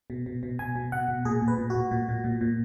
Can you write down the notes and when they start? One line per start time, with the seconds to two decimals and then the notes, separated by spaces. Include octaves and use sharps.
0.10 B2
0.26 B2
0.43 B2
0.59 B2 G#5
0.76 B2
0.92 B2 F#5
1.08 B2
1.25 A#2 G#4
1.42 A#2
1.48 B4
1.58 A#2
1.70 A#2 F#4
1.91 A#2
2.09 A#2
2.24 A#2
2.41 A#2